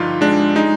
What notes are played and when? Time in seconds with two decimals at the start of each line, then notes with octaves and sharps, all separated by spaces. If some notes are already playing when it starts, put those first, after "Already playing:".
Already playing: G2 D3 F3 D#4 F4 G4
0.21 G#3 D4
0.55 G#3 D#4